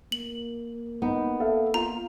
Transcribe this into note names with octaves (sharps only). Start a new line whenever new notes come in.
A#3 F#7
B3 D#4
A4 E5 F5
F4 A#5